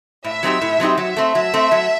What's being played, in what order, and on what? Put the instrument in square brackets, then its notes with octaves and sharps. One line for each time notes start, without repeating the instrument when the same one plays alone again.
[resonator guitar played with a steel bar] A2 [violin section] E5
[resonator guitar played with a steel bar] F#3 C4 D#4 G4
A2
F#3 C4 D#4 G4
[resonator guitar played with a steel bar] F#3 [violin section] E5
[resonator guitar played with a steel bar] A3 C4
[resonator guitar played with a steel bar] F#3 [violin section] E5
[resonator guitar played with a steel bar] A3 C4
F#3